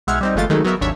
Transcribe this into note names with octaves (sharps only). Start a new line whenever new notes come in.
B1 G#3 E5 F#5 F6 G#6
G3 C4 D#4
G1 E3 G#3 A3 F4 A6
D#3 E3 F#3 G#3 A3 D#4
F#3 B3 A#4 E5
G#1 D#2 D4 C#5 E5